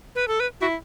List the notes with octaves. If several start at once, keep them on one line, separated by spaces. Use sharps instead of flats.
B4
A4
B4
E4 F#4